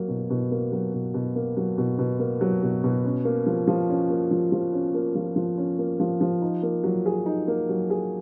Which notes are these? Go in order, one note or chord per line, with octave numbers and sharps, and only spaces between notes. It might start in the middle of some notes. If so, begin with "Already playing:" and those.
Already playing: F#3 A#3
B2
B2
A#3
F#3
B2
B2
A#3
F#3
B2
B2
A#3
F#3
B2
B2
C#4
A#3
F3
F3
C#4
A#3
F3
F3
C#4
A#3
F3
F3
C#4
A#3
F3
F3
D#4
A#3
F#3
G#4
D#4
A#3
F#3
G#4